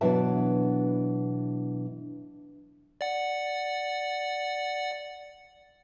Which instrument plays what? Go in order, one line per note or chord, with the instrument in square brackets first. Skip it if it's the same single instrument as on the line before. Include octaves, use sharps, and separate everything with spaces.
[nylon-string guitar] B2 E3 F#3 D4 E5 A5
[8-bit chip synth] D5 F#5